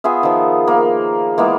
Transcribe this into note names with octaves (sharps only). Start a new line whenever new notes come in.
B3 F4 G#4 E5
D#3 F3
A#3
E3 G#3 A#3 B3